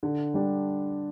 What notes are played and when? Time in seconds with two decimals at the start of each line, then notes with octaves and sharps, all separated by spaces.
0.03 D3
0.34 G3 D4